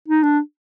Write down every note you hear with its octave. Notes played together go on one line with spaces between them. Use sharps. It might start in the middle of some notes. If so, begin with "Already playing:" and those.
D#4
D4